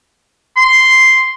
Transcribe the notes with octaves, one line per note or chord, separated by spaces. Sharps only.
C6